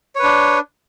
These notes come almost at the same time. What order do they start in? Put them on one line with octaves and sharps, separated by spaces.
C#5 B4 D4